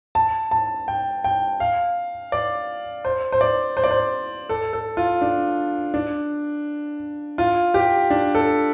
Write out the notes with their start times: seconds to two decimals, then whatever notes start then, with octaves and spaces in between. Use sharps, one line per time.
0.15 A5
0.51 A5
0.88 G5
1.24 G5
1.60 F5
2.32 D5
3.05 C5
3.32 C5
3.41 D5
3.77 C5
3.84 D5
3.91 C5
4.49 A4
4.73 A4
4.97 F4
5.22 D4
5.94 D4
7.38 F4
7.74 G4
8.10 D4
8.35 A4